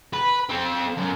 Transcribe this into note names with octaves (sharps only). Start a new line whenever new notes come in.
B4
C4 A4
F#2